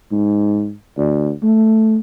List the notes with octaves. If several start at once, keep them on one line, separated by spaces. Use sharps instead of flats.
G#2
D2
A3